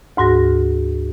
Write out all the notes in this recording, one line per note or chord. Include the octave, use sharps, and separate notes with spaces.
D2 G#2 F#4 A#6